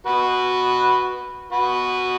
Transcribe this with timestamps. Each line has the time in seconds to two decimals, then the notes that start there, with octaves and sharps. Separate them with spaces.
0.06 F#4 B4
1.52 F#4 B4